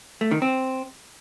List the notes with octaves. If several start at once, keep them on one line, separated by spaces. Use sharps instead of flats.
A3
D#3
C4